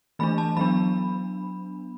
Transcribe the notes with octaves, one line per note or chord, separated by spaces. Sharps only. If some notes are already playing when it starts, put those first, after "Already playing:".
E3 A3 D4 B5
A5
F#3 B3 D4 B5